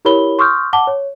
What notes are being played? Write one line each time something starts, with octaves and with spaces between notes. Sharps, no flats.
E4 G4 A#4 C#5 B5 G7
C6 C#6 D#6 F6 G6
F#5 A5 D6 G7
C#5